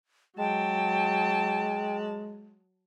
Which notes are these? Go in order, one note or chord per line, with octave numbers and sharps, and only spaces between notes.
F#3 G#3 G5 A5